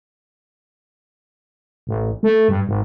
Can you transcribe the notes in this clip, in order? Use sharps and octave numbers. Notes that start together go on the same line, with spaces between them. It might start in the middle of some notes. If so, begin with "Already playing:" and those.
A1
A3
G2
G#1